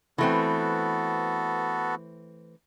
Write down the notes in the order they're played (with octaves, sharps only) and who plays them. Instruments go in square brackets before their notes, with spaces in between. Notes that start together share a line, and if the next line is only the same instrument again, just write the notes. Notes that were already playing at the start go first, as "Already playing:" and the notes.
[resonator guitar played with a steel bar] E3 A3 C4 [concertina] B3 F#4 A4